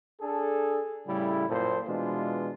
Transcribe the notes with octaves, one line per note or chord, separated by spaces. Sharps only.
D4 G#4 A4
A2 C#3 G3 E4
F#2 A#2 A4 C5
B2 E3 G#3 D4 F4